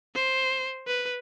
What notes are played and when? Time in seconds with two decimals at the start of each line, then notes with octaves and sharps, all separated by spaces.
0.15 C5
0.88 B4